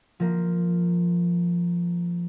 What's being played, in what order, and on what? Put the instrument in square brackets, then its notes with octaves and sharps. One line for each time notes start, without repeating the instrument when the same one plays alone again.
[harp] F3 A#3